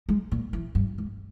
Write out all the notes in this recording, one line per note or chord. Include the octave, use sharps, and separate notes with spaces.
G#3
A#2
E3
G2
G#2